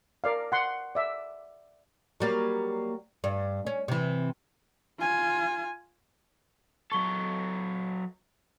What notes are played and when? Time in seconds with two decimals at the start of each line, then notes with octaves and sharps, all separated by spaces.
0.24 A#4 D5 F5
0.52 F#5 C6
0.95 D5 E5
2.20 F#3 G3 A#3
3.24 G2
3.67 C#4
3.88 C3 E3
4.99 F4 G#5
6.92 F#3 A4 C#6 G7